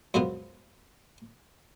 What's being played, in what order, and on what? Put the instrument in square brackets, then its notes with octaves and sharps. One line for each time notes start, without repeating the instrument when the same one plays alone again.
[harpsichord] C#2 F#2 B2 F3 B3